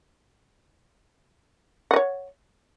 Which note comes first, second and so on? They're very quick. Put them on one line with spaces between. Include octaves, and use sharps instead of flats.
F#5 D#5 C#5